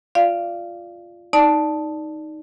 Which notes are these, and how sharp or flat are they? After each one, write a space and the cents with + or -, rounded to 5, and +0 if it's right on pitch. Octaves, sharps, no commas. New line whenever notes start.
F4 +0 D5 +0 F5 -25
D#4 +0 D5 +0 A5 +0